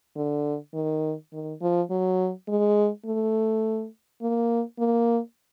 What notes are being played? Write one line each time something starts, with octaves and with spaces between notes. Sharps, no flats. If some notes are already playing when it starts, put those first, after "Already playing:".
D3
D#3
D#3
F3
F#3
G#3
A3
A#3
A#3